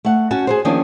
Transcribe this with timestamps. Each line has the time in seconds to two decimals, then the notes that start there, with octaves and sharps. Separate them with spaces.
0.05 A3 F#5
0.31 C#4 F#4 A5
0.47 G#4 A#4 C5
0.65 D#3 F3 A#3 C#4 D4